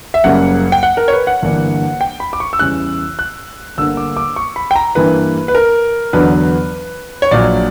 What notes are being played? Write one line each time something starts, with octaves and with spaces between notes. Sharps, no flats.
E5
F#1 F#2 C#3 G3 A#3 F#5
G5
F#5
A#4
C#5
B4
F#5
G1 G2 E3 A#3 D4
G5
B5
D6
C#6
E6
E2 C#3 E3 G3 C#4 F#6
F#6
G1 G2 D3 A#3 E6
D6
D6
C#6
B5
G5
A#5
G2 E3 A#3 E4 B4
B4
A#4
E2 D3 F#3 B3 D4 B4
C#5
A#1 A#2 F#3 D5